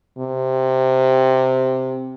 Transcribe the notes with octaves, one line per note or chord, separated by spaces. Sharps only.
C3